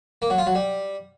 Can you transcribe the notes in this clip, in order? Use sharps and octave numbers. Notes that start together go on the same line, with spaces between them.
A#3
F#3
F4
F#3
G3